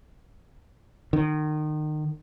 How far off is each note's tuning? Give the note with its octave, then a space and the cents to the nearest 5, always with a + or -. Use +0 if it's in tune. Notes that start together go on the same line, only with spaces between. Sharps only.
D#3 -30